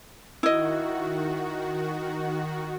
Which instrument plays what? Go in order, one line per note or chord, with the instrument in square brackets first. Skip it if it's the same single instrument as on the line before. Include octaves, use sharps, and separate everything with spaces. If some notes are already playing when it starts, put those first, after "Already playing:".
[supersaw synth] D#3 F#4 [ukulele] E4 D#5